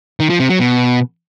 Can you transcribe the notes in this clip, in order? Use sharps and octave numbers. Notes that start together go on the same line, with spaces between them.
D#3
F3
C3
F#3
B2